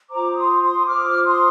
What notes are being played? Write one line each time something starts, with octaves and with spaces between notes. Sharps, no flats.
F4 C5 A#5 D6
C6 D#6
C6 D#6
F4 C5 D6 F6
C6 D#6